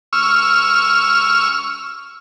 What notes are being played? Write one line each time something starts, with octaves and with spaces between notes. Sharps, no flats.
C#6 E6 F6